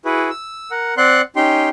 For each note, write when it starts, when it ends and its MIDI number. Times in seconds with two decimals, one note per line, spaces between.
0.05 0.30 64
0.05 0.30 66
0.05 0.30 68
0.05 0.30 71
0.30 0.71 88
0.71 0.94 70
0.71 0.94 78
0.97 1.22 60
0.97 1.22 74
0.97 1.22 78
0.97 1.22 84
0.97 1.22 90
1.36 1.69 61
1.36 1.69 63
1.36 1.69 67
1.36 1.69 79
1.36 1.69 84